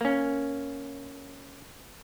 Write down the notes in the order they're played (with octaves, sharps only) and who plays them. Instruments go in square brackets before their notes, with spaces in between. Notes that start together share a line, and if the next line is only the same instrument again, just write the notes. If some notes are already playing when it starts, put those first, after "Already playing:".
[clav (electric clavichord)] A#3 C#4